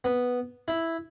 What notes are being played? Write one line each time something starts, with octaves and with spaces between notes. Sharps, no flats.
B3
E4